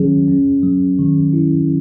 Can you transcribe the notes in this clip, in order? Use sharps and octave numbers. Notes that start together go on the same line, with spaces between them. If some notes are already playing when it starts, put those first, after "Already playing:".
Already playing: D#3 F#3 C#4 G#4
C#4
F#3
D#3
E4